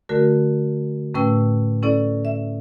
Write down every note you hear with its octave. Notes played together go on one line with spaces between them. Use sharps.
D3 A3 F#4 A#4
A2 A3 C#4 B4 G5 E6
C#4 E4 A4 D5
E5